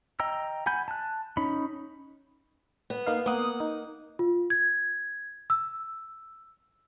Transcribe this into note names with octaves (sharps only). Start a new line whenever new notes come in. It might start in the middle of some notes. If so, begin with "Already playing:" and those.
D#5 G5 A#5 E6
F#5 G#5 B5 G6
A5 F#6
C#4 D#4 B5
B3
A#3 D#4 F5
A#3 B3 F#5 D#6
D#4
F4
G#6
E6